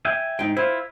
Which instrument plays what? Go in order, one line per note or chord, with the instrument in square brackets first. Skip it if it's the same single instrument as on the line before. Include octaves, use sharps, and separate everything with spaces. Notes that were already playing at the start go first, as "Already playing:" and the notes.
[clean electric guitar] E5 G5 G#5
[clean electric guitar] G#2 [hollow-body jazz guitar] D#4 G5
[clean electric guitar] E4 F4 [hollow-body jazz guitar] C5